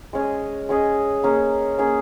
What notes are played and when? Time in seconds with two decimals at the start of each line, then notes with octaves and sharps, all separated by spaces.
0.13 G#3 C#4 G#4 D#5
0.69 G#3 C#4 G#4 D#5
1.23 A#3 C#4 G#4
1.78 A#3 C#4 G#4